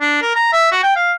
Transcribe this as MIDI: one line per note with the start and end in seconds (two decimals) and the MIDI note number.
0.01 0.20 62
0.22 0.31 70
0.36 0.51 82
0.53 0.67 76
0.71 0.81 66
0.83 0.94 79
0.96 1.12 77